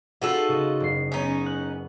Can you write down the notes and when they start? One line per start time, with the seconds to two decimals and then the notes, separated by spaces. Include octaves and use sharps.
0.22 D#4 F4 F#4 G#4 A4 B4
0.48 C#3 D#5
0.80 F#1 C7
1.12 B3 C#4 D#4
1.46 F#6